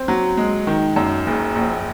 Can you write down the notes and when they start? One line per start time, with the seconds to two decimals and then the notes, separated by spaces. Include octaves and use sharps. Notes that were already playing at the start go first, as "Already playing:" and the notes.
Already playing: C4
0.08 F#3
0.37 G#3
0.67 D#3
0.96 F#2
1.27 F#1
1.55 A#1